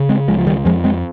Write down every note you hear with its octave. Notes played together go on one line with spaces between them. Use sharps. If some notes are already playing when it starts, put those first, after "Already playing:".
Already playing: C#3
G#3 C4
C#2 F3 G#3
F3
D#3 G3
F2 F3 G#3
G#3 C4